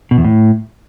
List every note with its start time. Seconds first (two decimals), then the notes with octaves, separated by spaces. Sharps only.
0.11 B2
0.18 E2
0.24 A2